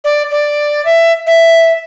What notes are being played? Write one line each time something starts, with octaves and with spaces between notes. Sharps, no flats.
D5
D5
E5
E5